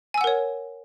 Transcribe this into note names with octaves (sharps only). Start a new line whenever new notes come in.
A#4 C#5 F#5 G#5 E6